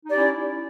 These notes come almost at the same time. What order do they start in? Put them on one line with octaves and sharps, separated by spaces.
D#4 D5 G4 C#4 E4